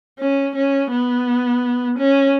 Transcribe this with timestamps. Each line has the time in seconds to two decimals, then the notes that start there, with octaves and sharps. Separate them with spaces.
0.19 C#4
0.55 C#4
0.91 B3
1.98 C#4